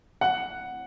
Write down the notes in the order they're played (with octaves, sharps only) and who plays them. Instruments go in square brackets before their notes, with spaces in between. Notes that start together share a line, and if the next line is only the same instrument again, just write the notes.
[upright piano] F#5